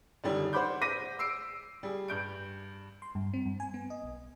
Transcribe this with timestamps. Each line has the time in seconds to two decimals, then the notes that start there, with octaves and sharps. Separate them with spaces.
0.24 F#2 D3 D#3 G3 D#4
0.53 C5 C#5 F#5 B5 D6 G6
0.82 D6 G6 A#6 B6 D#7
1.19 E6 C7 D7
1.83 G3 G#4
2.08 G2 G6 D7
3.02 C6
3.15 G2
3.34 C4
3.45 G2
3.60 G#5
3.74 B3
3.90 D#5
4.04 B1